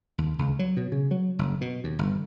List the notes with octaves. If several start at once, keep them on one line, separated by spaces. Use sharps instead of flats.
D#2
C#2
F#3
B2
C#3
F#3
F#1
B2
D#2
G1